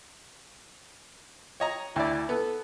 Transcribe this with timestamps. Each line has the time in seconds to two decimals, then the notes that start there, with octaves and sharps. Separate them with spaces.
1.60 C#5 D#5 A#5
1.96 D2 E4 D5
2.29 B3 A4